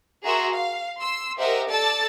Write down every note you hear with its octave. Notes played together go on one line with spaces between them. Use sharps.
F#4 G#4 A#4 E5 A#5 C6
F5
C6 E6
G4 A#4 C5 D#5 E5 F#5
A4 D5 A5 E6 A6